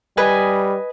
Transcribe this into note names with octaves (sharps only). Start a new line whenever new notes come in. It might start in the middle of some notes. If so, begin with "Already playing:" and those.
G3 B4 D#5 G#5